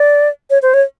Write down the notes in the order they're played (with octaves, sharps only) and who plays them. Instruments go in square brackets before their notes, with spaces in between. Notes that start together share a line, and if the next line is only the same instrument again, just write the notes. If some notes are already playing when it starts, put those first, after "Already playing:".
Already playing: [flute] D5
C#5
C5
C#5